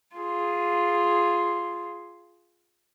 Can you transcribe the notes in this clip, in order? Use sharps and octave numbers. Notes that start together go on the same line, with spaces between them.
F4 G#4